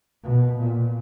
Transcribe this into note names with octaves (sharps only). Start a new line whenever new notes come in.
B2
A#2